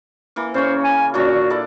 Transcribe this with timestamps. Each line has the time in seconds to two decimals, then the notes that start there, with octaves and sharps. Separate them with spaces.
0.36 E3 A#3
0.54 C#3 C#4 C5 C#5
0.84 G#5
1.14 A#2 D4 F#4 C#5
1.50 E4 A4 D5